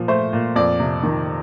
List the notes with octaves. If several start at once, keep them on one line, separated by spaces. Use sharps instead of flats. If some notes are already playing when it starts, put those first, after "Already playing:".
Already playing: A#2 F3
A3 C5
A#2
F2 D5
C3
D#3